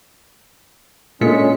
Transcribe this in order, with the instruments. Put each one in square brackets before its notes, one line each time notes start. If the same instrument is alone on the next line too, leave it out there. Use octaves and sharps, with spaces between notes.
[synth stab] A#2 B6 C#7 [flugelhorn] G#3 [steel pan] A3 B3 D4 [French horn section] C#4